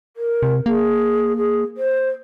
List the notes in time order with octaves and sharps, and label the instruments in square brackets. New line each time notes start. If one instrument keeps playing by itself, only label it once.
[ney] A#4
[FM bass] C3
[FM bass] A#3 [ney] G#4
[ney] G#4
C5